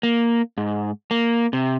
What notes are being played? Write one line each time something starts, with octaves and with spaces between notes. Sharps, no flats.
A#3
G#2
A#3
C3